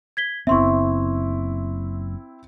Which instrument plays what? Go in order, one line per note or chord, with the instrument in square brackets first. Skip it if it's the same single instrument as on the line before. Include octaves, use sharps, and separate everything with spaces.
[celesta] G#6 B6 G7
[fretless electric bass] F#1 B3 [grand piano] C4 E4 [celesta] E5 C6 C#6